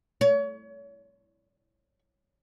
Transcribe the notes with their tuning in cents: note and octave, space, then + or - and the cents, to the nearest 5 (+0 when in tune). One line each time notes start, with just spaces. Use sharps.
C#5 +30